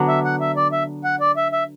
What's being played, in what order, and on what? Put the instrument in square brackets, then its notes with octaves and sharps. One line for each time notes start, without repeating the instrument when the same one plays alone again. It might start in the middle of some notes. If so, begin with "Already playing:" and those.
Already playing: [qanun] D3 F#3 B3 D4
[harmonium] E5
F#5
E5
D5
E5
F#5
D5
E5
E5